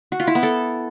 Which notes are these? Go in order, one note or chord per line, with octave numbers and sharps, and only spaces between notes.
F#4
F4
E4
B3
A4